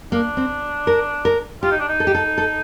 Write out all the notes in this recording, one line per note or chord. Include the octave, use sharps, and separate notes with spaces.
A#3 D4
C4
A#4
A#4
F4 G4
D#4
D4
D#4
A4
G4
A4
A4